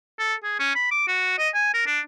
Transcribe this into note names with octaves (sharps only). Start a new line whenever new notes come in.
A4
G#4
C#4
B5
D6
F#4
D#5
G#5
A#4
D4